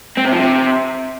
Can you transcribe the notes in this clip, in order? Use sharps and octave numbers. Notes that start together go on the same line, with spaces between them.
C4
C3
F3
C3